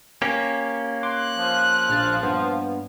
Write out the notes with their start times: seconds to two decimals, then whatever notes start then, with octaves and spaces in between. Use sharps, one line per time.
0.22 A#3 C#4 G4
1.03 C6 D6 F#6
1.38 F3
1.89 A#1 F6 A6
2.23 G2 B3